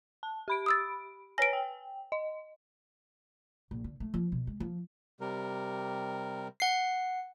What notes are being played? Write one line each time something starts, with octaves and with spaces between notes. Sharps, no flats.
A5
G4 B5 D7
D#6 E6 A6
B4 C#5 G#5 A#6 D7
G5
D#5
A#1
D3
A3
F3
B2
G#3
F3
C3 G3 A#4
F#5 C7